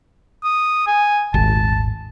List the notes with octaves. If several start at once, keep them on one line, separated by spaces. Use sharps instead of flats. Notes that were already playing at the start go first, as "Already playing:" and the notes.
D#6
G#5
D#1 G#1 A5